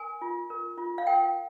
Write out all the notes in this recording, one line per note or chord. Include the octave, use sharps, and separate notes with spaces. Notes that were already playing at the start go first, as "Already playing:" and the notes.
Already playing: A#4 G#5
F4
A#4
F4
F5
A#4 G5